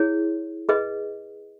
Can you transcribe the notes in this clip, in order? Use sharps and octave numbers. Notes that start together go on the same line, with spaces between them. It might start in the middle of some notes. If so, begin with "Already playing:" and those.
Already playing: E4 G#4 C#5
G#4 B4 D#5